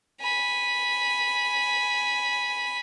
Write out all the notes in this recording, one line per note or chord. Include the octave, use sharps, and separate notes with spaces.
G#5 B5